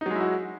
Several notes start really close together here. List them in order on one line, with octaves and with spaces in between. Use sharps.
D#4 F#3 G#3 E4 F#4